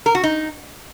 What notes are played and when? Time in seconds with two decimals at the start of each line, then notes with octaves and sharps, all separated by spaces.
0.06 A#4
0.15 F#4
0.23 D#4